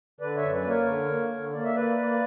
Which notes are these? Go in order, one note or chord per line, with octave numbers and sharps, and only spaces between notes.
D3 B4 D5
C#5 E5
F#2
B4 D5
A#3
A#4 C#5
D3
A#3
D3
A#3 D5
E5
A#3 B4 D5
A#3